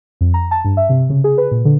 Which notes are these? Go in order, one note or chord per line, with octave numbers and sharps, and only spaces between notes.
F2
A#5
A5
G2
E5
C3
C#3
G#4
B4
A#2
D3